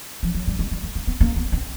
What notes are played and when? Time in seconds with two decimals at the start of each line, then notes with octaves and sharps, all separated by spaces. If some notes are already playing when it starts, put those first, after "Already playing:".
0.23 F3
0.35 F#3
0.48 G3
0.59 G#3
0.71 G3
0.83 A3
0.95 A#3
1.07 B3
1.21 A#3
1.36 B3
1.52 C4